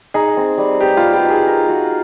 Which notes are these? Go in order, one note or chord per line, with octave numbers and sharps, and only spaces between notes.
D#4 G#4
C4
G3
G4 B4
F4
F#4
G4
D#4
G#4
A#4
F#4